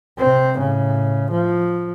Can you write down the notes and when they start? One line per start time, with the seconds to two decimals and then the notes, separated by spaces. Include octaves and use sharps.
0.19 C3 C4
0.58 A2 C#3
1.31 F3